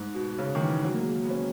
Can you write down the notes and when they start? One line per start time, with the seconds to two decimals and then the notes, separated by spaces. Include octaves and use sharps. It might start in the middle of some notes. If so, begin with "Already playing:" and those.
Already playing: G#2
0.14 B2
0.38 C#3
0.55 D#3
0.61 E3
0.84 F#3
0.94 A#3
0.99 G#3
1.15 G#3
1.24 B3
1.30 C#4